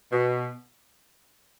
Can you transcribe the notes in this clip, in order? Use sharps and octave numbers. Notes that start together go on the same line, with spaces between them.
B2